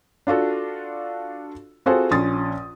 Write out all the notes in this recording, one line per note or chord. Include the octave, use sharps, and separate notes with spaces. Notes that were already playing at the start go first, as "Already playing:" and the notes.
D4 F4 F#4 A4
C4 F4 F#4 G#4 A4 C5
A#1 C#4 C6 D#6 A6